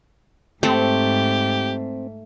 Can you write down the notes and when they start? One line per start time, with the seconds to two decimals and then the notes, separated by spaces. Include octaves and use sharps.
0.63 G#2 A3 C4 G4